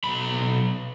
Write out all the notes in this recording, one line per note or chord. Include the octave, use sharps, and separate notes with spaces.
B1 B5